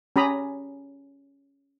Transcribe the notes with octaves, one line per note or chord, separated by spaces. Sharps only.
C#4 G4 A#5 B5 D#6